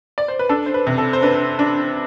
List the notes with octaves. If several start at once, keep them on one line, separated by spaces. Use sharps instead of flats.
D5
C5
B4
D4 A4
C5
B4
C3
A4
C5
D4 B4
D4